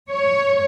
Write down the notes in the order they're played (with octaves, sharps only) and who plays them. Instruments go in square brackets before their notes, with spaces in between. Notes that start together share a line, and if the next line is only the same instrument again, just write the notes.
[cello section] C#5